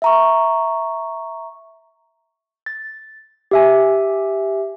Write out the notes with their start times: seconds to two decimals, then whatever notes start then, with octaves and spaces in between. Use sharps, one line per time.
0.02 E5 A#5 C#6
2.66 A6
3.51 G4 E5 G#5